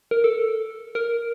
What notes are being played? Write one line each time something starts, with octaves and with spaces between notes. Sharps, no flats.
A#4
A4
A#4